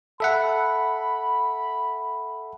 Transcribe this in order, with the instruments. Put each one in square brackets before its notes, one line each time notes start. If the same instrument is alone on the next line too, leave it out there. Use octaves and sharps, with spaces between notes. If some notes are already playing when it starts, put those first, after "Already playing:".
[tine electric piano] A4 E5 F#5 [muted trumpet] B5